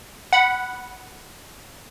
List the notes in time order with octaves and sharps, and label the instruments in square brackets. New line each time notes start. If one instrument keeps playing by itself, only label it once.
[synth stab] F#5 B5